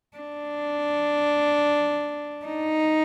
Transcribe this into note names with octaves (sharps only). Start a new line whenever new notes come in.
D4
D#4